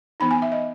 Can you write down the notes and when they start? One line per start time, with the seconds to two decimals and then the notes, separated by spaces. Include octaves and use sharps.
0.20 E3 B3 D#4 B5
0.31 G#5
0.42 E5
0.52 D#5